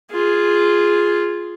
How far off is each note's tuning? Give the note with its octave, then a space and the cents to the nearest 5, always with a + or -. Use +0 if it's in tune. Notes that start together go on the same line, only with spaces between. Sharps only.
F4 +0 G#4 +0